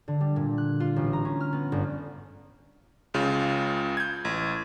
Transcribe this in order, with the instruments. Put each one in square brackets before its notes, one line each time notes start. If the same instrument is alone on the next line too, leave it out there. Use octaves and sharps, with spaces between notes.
[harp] D3
G3
A#2
F#6
F4
A1
A#5
C#4
F6
B3
G1
[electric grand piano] C#2 C#3 F4
G6 G#6
A1